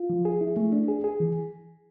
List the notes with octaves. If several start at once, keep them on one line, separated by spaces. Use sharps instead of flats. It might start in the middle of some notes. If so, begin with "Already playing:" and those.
Already playing: F4
F3
G#4
E4
A3
D4
G#4
G#4
E3